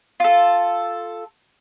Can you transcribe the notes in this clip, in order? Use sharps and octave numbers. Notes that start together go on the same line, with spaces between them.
F4 A4